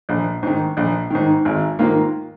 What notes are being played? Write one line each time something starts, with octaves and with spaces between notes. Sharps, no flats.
A#1
G#2 D#3
A#1
G#2 D#3
G#1
G#2 D#3 A#3 F4